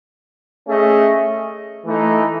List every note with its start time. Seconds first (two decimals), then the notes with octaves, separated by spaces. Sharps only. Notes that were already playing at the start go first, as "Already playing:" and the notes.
0.66 A3 C#4 G#4 D#5
1.85 E3 A3 D#4